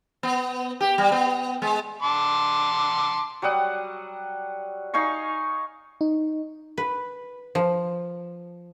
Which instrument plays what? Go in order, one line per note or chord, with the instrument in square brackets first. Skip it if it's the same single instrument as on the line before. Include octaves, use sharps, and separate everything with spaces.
[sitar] B3
G4
G3
B3
G#3
[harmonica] A5 C6 D6
[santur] F#3 G3 F#5 D#6
D#4 F5 G#5 C#6
[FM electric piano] D#4
[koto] B4
F3